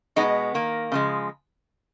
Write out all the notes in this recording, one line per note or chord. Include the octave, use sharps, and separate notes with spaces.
B2 G#3 B3 D#4
D#3 A#3
C#3 F3 G#3